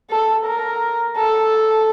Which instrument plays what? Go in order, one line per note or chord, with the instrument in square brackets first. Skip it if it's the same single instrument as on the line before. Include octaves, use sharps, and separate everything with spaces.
[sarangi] A4
A#4
A4